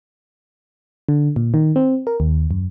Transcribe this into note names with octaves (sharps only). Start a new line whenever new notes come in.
D3
A#2
D#3
C4
A#4
D#2
F#2